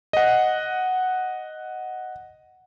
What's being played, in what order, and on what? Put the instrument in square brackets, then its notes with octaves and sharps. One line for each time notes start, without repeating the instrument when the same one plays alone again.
[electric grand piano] D#5 F#5